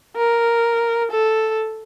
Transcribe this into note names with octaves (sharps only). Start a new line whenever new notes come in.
A#4
A4